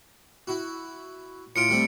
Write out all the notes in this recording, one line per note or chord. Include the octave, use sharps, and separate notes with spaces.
E4 F#4
A2 F4 C#7 D7
G3 A3 C4